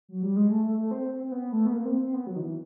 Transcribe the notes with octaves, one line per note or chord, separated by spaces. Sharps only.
F#3
G3
G#3
A3
A3
A3
C4
C4
C4
B3
A3
B3
A#3
C4
C4
B3
F#3
D#3
E3